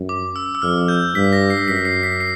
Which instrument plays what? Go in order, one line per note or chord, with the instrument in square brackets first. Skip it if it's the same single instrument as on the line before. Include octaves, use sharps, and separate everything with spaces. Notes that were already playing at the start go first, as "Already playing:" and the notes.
Already playing: [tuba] F#2
[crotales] D6
E6
E6
[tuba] F2 [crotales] F6
[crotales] G6
[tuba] G2 [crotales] B6
[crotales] A#6
C7
[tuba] F#2 [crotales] B6
[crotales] C7
B6
C7